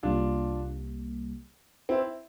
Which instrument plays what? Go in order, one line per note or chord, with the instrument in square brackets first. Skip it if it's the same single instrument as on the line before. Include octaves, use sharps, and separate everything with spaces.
[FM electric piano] C2 C3 G3 A#3 [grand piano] D4 F4
[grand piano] C4 E4